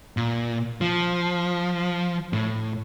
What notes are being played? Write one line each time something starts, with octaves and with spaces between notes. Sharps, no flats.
A#2
F3
A2